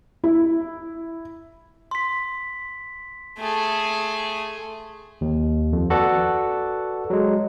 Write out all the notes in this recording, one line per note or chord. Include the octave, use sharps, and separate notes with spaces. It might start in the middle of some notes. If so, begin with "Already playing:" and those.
E4
C6 B6
A3 G#4
D#2
F2
F#4 A4 B4 D5 F#5
F#3 G#3